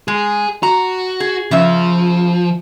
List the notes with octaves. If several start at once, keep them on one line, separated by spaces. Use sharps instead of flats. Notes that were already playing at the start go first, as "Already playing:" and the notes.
G#3 G#4
F#4 A#5
G#4
C#3 F3 E5